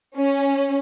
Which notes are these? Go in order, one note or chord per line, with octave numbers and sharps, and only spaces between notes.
C#4